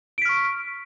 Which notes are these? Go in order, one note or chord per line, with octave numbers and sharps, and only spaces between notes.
C#6 F6 B6 D7